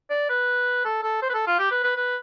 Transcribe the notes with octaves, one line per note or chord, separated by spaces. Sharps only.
D5
B4
A4
A4
C5
B4
A4
F4
G4
B4
B4
B4